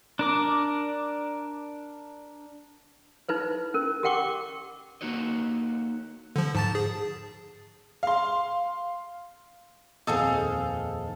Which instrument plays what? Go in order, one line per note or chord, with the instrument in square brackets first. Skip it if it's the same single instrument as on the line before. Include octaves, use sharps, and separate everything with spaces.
[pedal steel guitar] D4 A#4 D6
[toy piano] D#4 E4 B4 C5
C#4 A#4
G4 A#4 F#5 G5 C#6 D6
[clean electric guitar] A#3 D#4 F#4 C#5 D#5
[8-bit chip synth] D3 F3
G#2 A5 A6
G#4
[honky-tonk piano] F5 C6
[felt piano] D#1 F2 C5 [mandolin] D#4 G#4 F5 [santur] A4